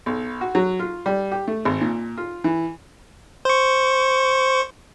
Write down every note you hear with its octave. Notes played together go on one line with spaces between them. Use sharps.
B1
F#4
F#3
F4
G3
G4
A3
G#1
A#2
F4
E3
C5 C#6